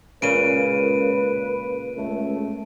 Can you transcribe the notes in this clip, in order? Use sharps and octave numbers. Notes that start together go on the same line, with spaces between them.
C#2 A#2 C#3 B4 D7 D#7
C#2 A3